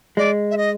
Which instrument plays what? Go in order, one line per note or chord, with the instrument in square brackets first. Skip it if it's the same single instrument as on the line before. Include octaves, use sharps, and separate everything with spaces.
[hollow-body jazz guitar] G#3 [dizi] D5
[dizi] E5
D#5